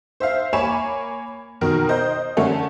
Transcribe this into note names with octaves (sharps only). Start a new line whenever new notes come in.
C5 E5 F5
A#3 C#5 G#5 B5 E7
B2 D#3 A#4
C5 D#5 G6
D3 A3 C#4